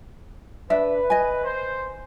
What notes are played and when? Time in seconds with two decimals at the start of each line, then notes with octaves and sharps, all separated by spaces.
0.70 D4 B4 E5
1.10 D#5 G#5
1.44 C5